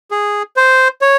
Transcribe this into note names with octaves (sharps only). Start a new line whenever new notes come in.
G#4
C5
C#5